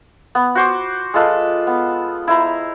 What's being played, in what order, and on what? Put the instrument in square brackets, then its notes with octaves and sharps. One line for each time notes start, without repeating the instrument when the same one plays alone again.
[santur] B3
F#4 C5 D6
G#3 F4 A4 B4
B3
E4 C5 A#5